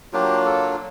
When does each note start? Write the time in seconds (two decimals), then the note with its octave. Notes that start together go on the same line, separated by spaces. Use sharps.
0.13 F#3 A#3 D4 F4 G4
0.46 A4